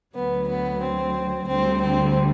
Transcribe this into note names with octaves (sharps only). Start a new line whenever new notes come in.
D2 D3 F#3 B3
B3
C4
D2 D3 G3 C4
C4